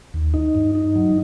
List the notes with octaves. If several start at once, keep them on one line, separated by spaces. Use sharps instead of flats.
D#2
D#4
G2
D#4
F#3